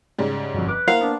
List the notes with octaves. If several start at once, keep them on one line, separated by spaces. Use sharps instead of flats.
G#2 C#3 G3
G1 F2 B2
B4 D6
A#3 E4 A#4 C5 F5 F#5
B3 D4